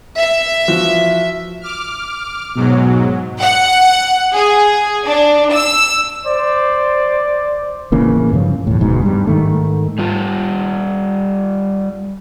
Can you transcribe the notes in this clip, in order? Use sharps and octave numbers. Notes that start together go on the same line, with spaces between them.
E5
E3 F3 F#4
D6 F6
G#2 B2 F#3
F#5
G#4
D4
E6
C5 D5
A1 C#3 E3 A#3
G2 C#3 F3 C#4
E2 A2
E1 D2 G#2 B2
G2 G3
G#2 D#3 A3
G3 F4